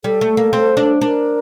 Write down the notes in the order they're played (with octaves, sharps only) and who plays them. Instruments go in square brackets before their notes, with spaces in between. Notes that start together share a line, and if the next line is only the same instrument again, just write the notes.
[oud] G3 [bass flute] A4
[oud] A3
A#3
C4
D4
[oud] D4 [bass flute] A#4